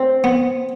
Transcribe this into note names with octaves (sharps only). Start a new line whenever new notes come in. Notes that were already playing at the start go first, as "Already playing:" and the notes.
Already playing: C4
B3